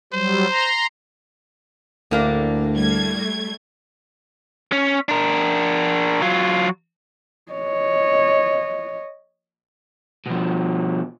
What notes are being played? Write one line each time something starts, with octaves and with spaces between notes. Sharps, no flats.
F#3 G3 C5
A#5 C6
D2 A2 A#3 D4
G3 A3 G#6
C#4
D4 A#4
F#3 F4
C#5 D#5
B2 F3